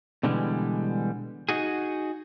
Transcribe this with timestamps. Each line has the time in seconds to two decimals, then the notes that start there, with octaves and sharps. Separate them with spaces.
0.23 B2 D3 E3 G3 G#3
1.49 D#4 F#4 G#4